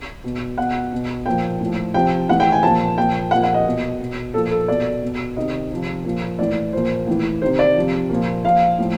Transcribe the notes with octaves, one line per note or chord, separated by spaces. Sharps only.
B2
B2 F#5
B2
A#2 F3 G5
A2 F3
C3 F3 G5
A2 E3 F#5
G5
G#5
A#2 F3 A5
A#2 F3 G5
A#2 F3 F#5
F#5
D#5
B2
B2
A#2 F3 A4
A4
B2 D5
B2
C3 D#3 D#5
C3 F3
A#2 F3
A2 E3 D5
A#2 F3 C5
A2 E3
C3 D#3 C5
D5
C3 F3
A#2 F3
A#2 F3 F5
A2 F3